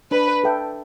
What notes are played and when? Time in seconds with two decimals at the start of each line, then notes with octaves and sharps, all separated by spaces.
0.11 D4 B4
0.44 A4 E5 G5